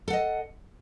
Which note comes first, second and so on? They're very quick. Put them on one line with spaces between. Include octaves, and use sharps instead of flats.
A4 F#5 D#5